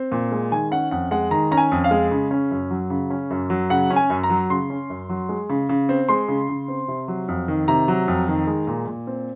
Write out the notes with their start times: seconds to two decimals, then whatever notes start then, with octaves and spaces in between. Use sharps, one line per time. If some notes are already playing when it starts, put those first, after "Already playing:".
Already playing: C4
0.12 A#2
0.32 G#3
0.51 D#3 G#5
0.71 C#4 F#5
0.91 F2 F#5
1.11 G#3 F#5
1.31 D#3 A#5
1.51 C#4 A#5
1.57 G#5
1.71 F2
1.84 F5
1.91 G#3
2.11 C#3
2.31 C#4
2.51 F#2
2.71 F#3
2.90 C#3
3.10 C#4
3.30 F#2
3.50 F#3
3.70 C#3 F#5
3.90 C#4
3.96 G#5
4.10 F#2
4.23 A#5
4.30 F#3
4.49 C#3 C6
4.70 C#4
4.90 F#2
5.09 F#3
5.29 G#3
5.49 C#3
5.69 C#3
5.89 C4
6.09 G#3 C6
6.28 C#3
6.49 C#3
6.68 C4
6.88 C3
7.08 F#3
7.28 F2
7.48 D#3
7.68 C3 A#5
7.88 F#3
8.08 F2
8.28 D#3
8.47 G#3
8.67 A#2
8.87 A#2
9.07 C4